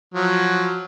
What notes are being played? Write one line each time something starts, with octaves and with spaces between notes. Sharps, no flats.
F3 F#3